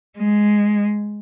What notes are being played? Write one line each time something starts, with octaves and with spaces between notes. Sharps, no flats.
G#3